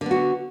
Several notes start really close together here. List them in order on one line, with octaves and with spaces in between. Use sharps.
D3 B3 F#4